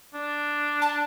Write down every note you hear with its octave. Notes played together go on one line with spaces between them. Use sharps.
D4
A5